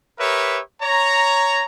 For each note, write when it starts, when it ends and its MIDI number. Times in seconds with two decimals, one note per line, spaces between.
0.19 0.60 67
0.19 0.60 70
0.19 0.60 71
0.19 0.60 73
0.19 0.60 76
0.82 1.66 73
0.82 1.66 82